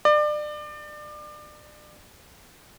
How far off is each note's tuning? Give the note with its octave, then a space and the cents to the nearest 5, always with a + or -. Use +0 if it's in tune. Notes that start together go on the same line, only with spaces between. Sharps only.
D5 +30